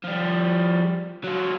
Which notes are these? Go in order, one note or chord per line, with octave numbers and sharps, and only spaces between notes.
F3 G3
F#3 F4